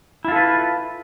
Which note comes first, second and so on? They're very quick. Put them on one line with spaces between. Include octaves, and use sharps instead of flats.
E4 F4 A4 B4